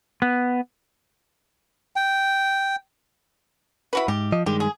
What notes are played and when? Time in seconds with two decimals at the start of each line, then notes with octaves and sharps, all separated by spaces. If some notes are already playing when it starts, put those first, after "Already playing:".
0.22 B3
1.96 G5
3.93 E4 F#4 B4
4.08 G#2 G4
4.32 F3 D#5
4.46 G2 D#3 G#3 G4
4.60 G#4